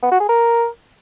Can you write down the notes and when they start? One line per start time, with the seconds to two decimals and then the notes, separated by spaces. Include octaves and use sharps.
0.03 B3
0.11 F#4
0.20 G#4
0.29 A#4